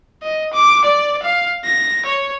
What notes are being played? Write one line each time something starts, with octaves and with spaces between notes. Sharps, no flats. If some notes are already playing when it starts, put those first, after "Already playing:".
D#5
D6
D5
F5
A#6
C#5